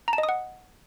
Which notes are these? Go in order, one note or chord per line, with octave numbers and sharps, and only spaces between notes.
A#5
A5
D#5
D#6
F#5